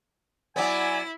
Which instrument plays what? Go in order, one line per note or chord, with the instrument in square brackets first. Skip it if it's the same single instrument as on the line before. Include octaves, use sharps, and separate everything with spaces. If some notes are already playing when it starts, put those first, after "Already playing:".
[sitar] F#3 B3 [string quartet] E4 [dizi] D5 [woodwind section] G#5